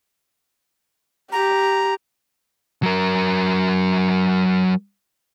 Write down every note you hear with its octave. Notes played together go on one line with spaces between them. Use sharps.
G4 A#5
F#3 A#4